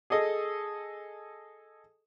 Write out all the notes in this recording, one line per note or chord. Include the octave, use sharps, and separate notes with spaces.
G#4 A4 D#5